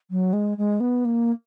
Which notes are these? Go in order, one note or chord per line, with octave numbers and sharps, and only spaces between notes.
F#3
G#3
G#3
B3
A#3